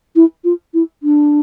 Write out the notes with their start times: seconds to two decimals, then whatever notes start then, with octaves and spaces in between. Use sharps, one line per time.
0.16 E4
0.44 F4
0.74 E4
1.03 D4